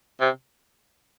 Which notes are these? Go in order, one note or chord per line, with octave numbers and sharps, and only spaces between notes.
C3